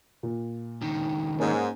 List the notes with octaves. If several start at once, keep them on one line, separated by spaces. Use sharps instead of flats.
A#2
C#2 D#3
G#2 A#3 C#4 G#4